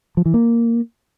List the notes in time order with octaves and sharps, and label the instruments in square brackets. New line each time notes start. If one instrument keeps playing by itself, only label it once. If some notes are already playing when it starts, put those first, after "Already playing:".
[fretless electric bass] F3
E3
A#3